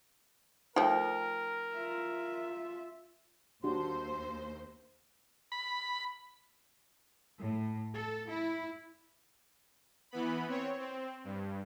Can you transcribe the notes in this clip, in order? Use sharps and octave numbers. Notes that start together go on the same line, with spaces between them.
F3 A3 D#4 A#4 G5
F4 E5
D#2 D4 F#4 G4 C5 C6
B5
A2
A4
E4
E3 B3 B5
C4 C#5
C4
G2